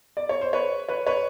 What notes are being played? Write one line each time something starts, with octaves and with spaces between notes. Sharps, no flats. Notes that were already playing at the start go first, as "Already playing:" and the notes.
D5
C#5
C5
B4 C#5
B4 C#5
B4 C#5